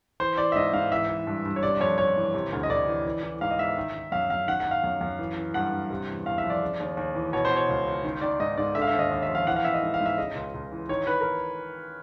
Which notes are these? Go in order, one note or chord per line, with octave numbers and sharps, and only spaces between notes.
E3 C5
E3 D5
E5
G#2 D#5
G#2 F5
E3 E5
E3
G2
G2
C#5
C3 D5
F2 C#5
F2 C#5
E3
C3
D2
D#5
D2 D5
E3
E3
E3
G#2 F5
D#5
G#2 E5
D#3
D#3
F#2 F5
F#2 F5
D#3 F#5
F#5
D#3
F5
F#2
F#2
E3
E3
G2 F#5
G2
C3
E2
E2 F5
E5
F3
D5
C#3
D#2
D#2
E3
B2 C#5
C5
B2
C#5
C#2
C#2
D#3
D#3 D5
G#2 D#5
G#2 D5
D3 E5
F5
E5
D#2
D#5
D#2 D#5
E5
F3
F5
E3 F#5
F5
E3 E5
D#5
G#2
F5
G#2
E5
C#3 D#5
C#2
C#2
E3
D#3 C#5
D#3 B4
A#4